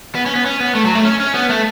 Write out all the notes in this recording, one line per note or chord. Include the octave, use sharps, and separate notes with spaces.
B3
C#4
B3
C#4
B3
A3
F#3
A3
C#4
C#4
B3
A3